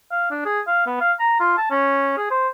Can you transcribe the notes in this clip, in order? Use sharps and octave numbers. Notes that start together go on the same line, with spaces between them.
F5
D4
G#4
F5
B3
F5
A#5
F4
A5
C#4
G#4
C5